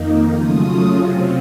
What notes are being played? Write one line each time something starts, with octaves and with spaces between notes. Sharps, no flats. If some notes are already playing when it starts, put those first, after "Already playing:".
Already playing: F2 D#3 A#3 D#4
C#3 F#3 A3 C#4 F4 D#6
C3 F#3 C4 F4